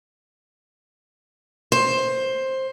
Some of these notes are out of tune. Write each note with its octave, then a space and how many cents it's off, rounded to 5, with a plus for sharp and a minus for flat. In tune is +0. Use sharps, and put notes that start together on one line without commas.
C5 +15